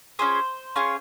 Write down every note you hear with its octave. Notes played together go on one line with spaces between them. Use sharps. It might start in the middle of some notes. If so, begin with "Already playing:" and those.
C#4 F4 G#4 C5
C#4 F4 G#4